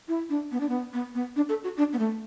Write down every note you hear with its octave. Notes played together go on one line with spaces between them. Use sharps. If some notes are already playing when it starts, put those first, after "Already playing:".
E4
D4
B3
D4
B3
B3
B3
D4
A4
F#4
D4
B3
A3